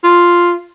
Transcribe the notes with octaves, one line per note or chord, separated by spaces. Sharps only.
F4